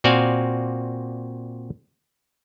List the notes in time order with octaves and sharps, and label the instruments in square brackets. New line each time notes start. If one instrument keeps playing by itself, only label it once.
[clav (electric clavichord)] A#2 C4 F#4 D5 F5 G#5